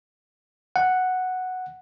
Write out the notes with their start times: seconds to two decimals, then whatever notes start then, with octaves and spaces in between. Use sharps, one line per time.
0.76 F#5